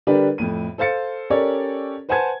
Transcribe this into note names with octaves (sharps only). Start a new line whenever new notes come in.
D3 G3 D4 G4 A#4 B4
F2 A2 D#7
A4 C5 F5 A6 C#7
C#4 G4 A4 A#4 C#5 D5
B4 C5 F#5 G#5 A5 G#6